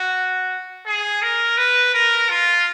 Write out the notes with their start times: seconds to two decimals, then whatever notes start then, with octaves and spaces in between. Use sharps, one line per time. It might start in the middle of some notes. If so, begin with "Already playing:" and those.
Already playing: F#4
0.86 G#4
1.22 A#4
1.57 B4
1.94 A#4
2.30 F4